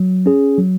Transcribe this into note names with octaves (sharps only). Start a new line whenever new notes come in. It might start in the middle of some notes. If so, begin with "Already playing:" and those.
Already playing: F#3
C#4 G#4
F#3